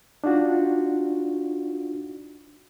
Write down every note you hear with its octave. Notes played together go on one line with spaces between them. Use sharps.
D4 D#4 F4 F#4